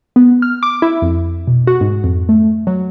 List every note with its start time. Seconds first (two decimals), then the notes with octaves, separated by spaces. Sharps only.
0.16 B3
0.42 F6
0.63 D6
0.82 E4
1.02 F2
1.47 B2
1.67 F#4
1.81 G#2
2.04 F2
2.29 A3
2.67 F#3